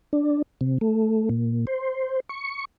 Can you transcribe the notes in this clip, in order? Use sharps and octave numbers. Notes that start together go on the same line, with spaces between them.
D4
C3
A3
A#2
C5
C#6